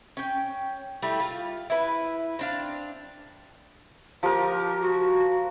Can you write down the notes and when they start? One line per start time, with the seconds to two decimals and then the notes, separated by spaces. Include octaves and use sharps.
0.17 C#4 G5
1.02 G3 A3 E4 G4
1.20 F4
1.70 E4 B4
2.39 C4 D4 F5
4.23 F3 G4 A#4
4.82 F#4